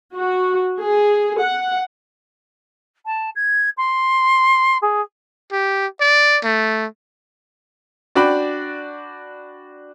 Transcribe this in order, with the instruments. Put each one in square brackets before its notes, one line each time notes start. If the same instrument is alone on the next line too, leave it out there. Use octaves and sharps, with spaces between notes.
[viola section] F#4
G#4
F#5
[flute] A5
G#6
C6
G#4
[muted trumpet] G4
D5
A3
[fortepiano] D4 F#4 D5 G5 B5